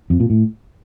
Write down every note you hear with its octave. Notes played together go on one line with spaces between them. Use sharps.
F2
A#2
A2